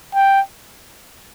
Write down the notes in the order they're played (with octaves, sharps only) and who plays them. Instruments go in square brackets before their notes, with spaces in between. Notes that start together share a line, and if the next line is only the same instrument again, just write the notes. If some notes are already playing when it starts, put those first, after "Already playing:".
[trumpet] G5